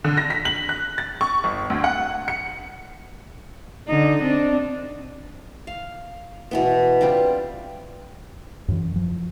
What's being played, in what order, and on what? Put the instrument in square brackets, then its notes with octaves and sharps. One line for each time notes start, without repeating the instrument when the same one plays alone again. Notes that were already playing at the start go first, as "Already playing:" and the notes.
[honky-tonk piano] D3
A#6
B6
F#7
F#6
A6
C#6
G1
D2
F#5
C#7
[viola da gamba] D3 D#4
C4 D4
[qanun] F5
B2 E3 B3
G3 C4 D4 F4
[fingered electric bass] F#2 E3
F3